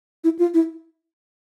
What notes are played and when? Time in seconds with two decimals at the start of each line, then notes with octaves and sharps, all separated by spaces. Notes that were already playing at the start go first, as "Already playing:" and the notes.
0.24 E4
0.39 F4
0.54 E4